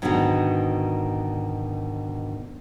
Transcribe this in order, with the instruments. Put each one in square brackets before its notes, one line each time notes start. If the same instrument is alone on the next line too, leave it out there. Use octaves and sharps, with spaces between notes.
[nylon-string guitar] G#2 B2 D3 D#3 B3 D#4